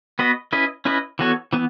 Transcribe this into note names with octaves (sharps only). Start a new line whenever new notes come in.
B3 F#4 B4 D#5
C#4 E4 B4 D#5
C#4 E4 B4 D#5
E3 B3 F#4 A4 C#5
E3 B3